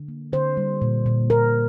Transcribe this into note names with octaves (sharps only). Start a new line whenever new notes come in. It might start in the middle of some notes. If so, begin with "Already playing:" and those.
Already playing: D3
A#3
D3 C5
G3
A#2
A#2
A#2 A#4